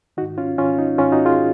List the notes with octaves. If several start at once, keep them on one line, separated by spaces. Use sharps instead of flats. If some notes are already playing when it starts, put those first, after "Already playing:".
G#2 D#3 D#4 F#4
C#4 F4
G#2 D#3 C#4 F4
D#4
G#2 D#3 C#4 F4
D#4 F#4
F4 G#4